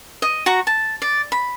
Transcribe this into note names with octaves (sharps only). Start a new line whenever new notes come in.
D#5
F#4 A#5 C#6
A5
D5
B5